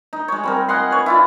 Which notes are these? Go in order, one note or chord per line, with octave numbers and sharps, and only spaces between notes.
D#4
G#3 C#5
G3 C4 A#4
D#5 F#5 G#5 C6
B4 C#5
E4 F4 D5